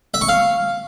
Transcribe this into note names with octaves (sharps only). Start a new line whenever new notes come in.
E5
C#6
F5